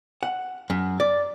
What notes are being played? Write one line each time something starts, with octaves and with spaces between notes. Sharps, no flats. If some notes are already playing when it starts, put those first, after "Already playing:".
F#5
F#2
D5